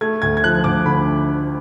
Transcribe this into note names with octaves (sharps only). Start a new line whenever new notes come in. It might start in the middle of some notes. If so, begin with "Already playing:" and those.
A3 G#6
D2 G#6
G#6
F3 F#6
D2 D6
D3 B5